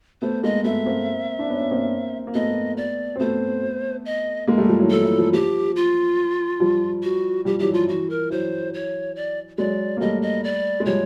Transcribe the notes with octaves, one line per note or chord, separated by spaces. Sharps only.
A3 B3 C5
G#3 A#3 D#5
A3 B3 E5
A#3 C4
D4
B3 C#4
B3
A#3 C4
A#3
A3 B3 D#5
D5
C4
A3 B3 C5
D#5
G#3 A#3
G3 A3
F3 G3
E3 F#3
E3 A4
E3
F3
F3 G4
F4
F3 G3
F#4
F3 G3 G4
E3 F#3 G4
F3 F4
E3 F#4
A#4
E3 F#3 C5
C#5
D5
F#3 G#3 D5
A#3
G3 A3 D#5
D#5
D5
G#3
F3 G3 C#5